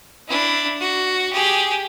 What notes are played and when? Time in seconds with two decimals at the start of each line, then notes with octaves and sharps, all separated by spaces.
0.28 D4 E4
0.80 F#4
1.32 G4 G#4